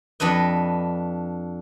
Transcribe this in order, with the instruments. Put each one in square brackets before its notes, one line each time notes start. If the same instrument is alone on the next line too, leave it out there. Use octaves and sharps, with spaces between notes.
[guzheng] F2 D4 B4 D#5